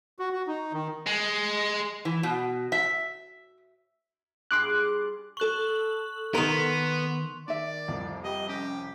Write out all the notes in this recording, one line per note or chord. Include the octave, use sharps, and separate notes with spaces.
F#4
F#4
D#4
D#3
G#3
E3
B2
E5
G2 F4 G#4 C6 D6 F#6
A4 C#6 F#6 F#7
D#3 B3 A#4 C6 F7
D#3 D#4 D5 E5
C2 F2
G4 B4 D#5
C#4 G4